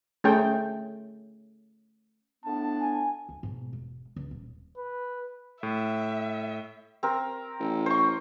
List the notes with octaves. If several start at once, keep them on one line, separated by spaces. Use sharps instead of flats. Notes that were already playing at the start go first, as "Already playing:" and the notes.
A3 C#4 G#4 G5
A2 B3 D4 A5
G#5
D2
G#2 B2
E1
C#2
D#1
B4
A2 E5
C4 A#4
A1
C5 C#6